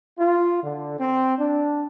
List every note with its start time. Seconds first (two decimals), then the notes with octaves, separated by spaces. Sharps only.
0.18 F4
0.63 D3
0.98 C4
1.38 D4